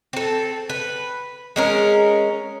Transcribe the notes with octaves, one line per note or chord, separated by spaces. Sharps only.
C4 A4
B4
G#3 C#4 A#4